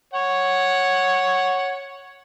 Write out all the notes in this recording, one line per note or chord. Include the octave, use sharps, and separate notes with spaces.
C#5 F#5